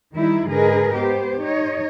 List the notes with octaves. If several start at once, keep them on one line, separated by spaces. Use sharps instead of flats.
D#3 G3 D#4 E4
G#2 D3 G#4 A#4 B4 D#5
B3 G4 C5
D#4 C#5 D#5